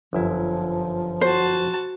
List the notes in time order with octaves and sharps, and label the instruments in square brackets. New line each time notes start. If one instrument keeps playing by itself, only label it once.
[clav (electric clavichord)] G1 F#2 E4 [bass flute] F3
[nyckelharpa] F#4 A5 [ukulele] C5